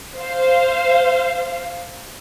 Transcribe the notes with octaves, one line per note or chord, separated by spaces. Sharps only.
C5 F5